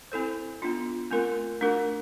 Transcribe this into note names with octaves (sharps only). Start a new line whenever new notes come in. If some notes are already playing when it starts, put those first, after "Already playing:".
C4 E4 A4 C5
B3 D4 F4
A3 C4 F4 A#4
A3 D4 F#4 A#4